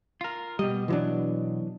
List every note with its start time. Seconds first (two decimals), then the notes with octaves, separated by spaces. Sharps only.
0.21 F4 A#4
0.59 B2 G3 D#5
0.88 E3 F#3 D4